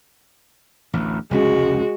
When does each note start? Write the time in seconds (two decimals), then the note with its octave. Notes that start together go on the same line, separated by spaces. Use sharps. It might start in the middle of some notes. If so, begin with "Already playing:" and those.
0.93 A1 D2
1.31 F1 C#2 G#3 C#4 F#4